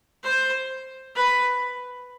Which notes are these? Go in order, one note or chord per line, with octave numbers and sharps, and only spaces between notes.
C5
B4